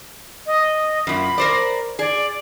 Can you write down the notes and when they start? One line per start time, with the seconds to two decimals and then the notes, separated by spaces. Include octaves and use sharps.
0.46 D#5
1.07 F#2 A#2 B5
1.38 A#4 C5 D5
1.99 G#4 D5